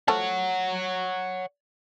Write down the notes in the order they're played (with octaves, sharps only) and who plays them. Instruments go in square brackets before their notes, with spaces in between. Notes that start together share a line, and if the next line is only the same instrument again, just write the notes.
[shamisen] F3 A3 A5 [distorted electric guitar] C#5 F#5